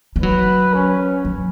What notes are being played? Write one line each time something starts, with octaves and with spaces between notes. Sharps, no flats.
G3
F#3 B4
C#4
F#3